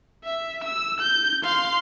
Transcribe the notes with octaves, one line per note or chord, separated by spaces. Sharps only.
E5
E6
G6
F5 C6